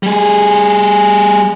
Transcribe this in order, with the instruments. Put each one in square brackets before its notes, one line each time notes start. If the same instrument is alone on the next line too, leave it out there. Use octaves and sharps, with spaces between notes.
[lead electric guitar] G3 G#4